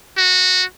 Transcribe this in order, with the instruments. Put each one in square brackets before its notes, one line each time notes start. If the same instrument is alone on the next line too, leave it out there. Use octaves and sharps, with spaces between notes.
[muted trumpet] F#4